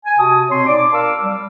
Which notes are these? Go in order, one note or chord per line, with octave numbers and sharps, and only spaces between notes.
G#5
C3 F#4 A5 D#6
B2 C4 C#5 C6
D#4 D5 D6
A#4 F5 A5 D6 E6
G3